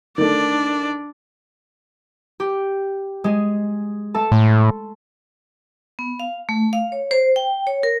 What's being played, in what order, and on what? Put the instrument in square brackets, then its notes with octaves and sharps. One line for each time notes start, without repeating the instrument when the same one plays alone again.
[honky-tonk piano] D#3 A3 [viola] D4 D5
[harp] G4
G#3 G#4
A3 A4 A5
[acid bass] A2 [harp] C6
[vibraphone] B3
F5
A3
F5
C#5
C5
G5
C#5
A#4